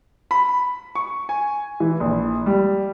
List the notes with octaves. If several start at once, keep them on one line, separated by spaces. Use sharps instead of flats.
B5
C#6
G#5
E3
A#1
G3